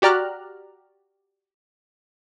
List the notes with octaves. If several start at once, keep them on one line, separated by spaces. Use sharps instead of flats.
F#4 G4 D5 A#5 F6 F#6